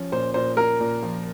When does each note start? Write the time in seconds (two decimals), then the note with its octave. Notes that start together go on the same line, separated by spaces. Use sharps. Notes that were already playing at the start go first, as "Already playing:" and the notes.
Already playing: F3 C#4
0.12 A#2 C5
0.34 A#2 C5
0.57 A#3 A#4
0.80 A#2
1.03 F3